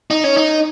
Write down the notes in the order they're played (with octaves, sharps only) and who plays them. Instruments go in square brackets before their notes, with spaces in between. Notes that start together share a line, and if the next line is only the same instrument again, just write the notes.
[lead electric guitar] D#4
C#4
D#4